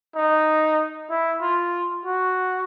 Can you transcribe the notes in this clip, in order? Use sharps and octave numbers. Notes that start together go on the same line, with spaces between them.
D#4
E4
F4
F#4